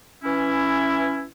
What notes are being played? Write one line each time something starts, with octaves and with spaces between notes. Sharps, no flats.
E3 C#4 E4